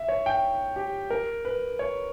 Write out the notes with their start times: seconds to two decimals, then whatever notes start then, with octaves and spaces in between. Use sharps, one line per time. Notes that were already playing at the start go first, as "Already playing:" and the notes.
Already playing: E5
0.09 C#5
0.26 G5
0.76 G4
1.10 A#4
1.45 B4
1.79 C#5